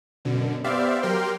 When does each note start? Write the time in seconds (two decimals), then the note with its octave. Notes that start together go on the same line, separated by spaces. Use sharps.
0.25 F#2 B2 D3
0.64 B3 G4 C5 D5 E5 F5
1.02 F#3 G4 A#4 G5 C6 F6